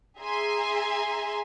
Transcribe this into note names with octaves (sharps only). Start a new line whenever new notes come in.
G#4 E5 G#5 A#5 C6